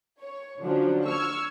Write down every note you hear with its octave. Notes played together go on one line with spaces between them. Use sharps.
C#5
D3 F3 F#3 C#4 D4
C#6 E6 F6 G#6